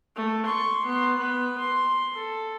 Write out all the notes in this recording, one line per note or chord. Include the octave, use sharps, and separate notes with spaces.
A3
C6 C#6
B3 C6
B3 B4
C6
A4